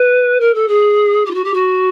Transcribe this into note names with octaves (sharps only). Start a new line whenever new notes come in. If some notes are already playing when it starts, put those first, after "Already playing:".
Already playing: B4
A#4
A4
G#4
G4
F4
F#4
G4
F#4